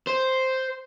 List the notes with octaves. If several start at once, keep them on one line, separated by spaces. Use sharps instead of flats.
C5